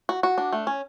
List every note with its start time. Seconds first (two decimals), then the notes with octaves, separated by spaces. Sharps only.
0.09 F#4
0.23 F#4
0.38 D4
0.53 A3
0.67 C#4